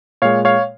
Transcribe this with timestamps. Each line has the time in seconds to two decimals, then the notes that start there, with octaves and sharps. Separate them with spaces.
0.22 A#2 G#3 C#5 F5
0.45 C#5 F5